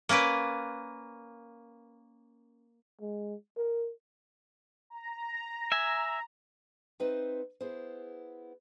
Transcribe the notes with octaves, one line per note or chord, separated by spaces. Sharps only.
A#3 C#4 A#4 B4 D5
G#3
A#4
A#5
E5 G#5
C4 D#4 B4 C5 E5
B3 E4 G#4 C5